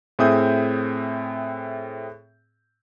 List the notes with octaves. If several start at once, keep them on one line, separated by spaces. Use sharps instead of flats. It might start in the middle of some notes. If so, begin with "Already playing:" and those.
A2 C4 G#4 E5 D#6 G6